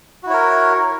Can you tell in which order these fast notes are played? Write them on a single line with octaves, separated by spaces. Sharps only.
F#4 E4 C#5 A#4